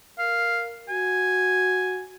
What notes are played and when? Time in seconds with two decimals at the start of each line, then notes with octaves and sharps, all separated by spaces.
0.19 A#4 F5
0.89 F#4 G#5